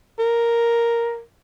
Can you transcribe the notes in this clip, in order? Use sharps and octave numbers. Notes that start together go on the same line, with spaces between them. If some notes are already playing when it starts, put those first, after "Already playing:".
A#4